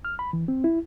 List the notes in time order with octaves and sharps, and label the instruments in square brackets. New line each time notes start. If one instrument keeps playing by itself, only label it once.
[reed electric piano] F6
B5
E3
C4
E4